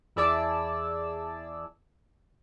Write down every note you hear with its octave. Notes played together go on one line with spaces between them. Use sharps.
E2 E4 G#4 D5 A5 E6